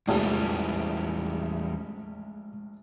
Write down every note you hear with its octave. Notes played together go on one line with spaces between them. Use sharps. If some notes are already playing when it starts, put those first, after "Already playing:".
F1 A#1 E2 G3 G#3